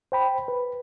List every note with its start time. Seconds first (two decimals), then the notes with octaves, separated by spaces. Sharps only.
0.12 C5 G5 B5
0.48 B4